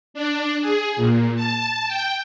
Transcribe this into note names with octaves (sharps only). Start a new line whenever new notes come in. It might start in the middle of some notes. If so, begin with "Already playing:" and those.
D4
G#4
A#2
A5
G5